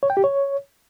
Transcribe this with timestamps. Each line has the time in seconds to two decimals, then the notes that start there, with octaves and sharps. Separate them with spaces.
0.03 C#5
0.10 G5
0.17 G4
0.24 C#5